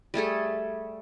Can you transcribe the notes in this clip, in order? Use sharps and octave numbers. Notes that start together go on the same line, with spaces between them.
G3 A3 G#4 A4